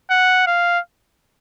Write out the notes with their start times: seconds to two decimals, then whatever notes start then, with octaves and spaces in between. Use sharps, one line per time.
0.10 F#5
0.47 F5